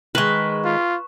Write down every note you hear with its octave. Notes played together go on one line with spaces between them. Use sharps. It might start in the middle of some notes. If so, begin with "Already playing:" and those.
D#3 G#3 B4 C#6 E7
F4